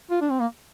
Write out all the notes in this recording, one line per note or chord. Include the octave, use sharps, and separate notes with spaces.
F4
D4
C4
A#3